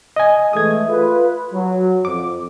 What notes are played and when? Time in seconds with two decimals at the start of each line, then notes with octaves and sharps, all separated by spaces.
0.16 D#5 G#5
0.53 E3 G#3 A3 D#6 G#6
0.89 F4 B4
1.53 F#3
2.05 F2 D6